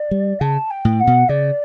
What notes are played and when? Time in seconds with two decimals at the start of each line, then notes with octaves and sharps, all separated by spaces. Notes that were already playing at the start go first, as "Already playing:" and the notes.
Already playing: D5
0.11 G3
0.40 C#3 A5
0.70 G5
0.85 A2
1.00 F#5
1.07 B2
1.29 C#3 D5